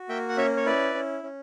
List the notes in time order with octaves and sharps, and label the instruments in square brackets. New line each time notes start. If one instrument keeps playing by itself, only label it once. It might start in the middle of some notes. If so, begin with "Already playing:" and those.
Already playing: [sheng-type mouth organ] F#4
A#3 E5 G5
F#5
C#4 C#5 E5
C#5
E4 B4 D5
C#4
C#4